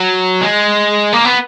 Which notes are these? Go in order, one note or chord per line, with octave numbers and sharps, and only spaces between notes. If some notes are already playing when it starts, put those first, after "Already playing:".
Already playing: F#3
G#3
A#3
B3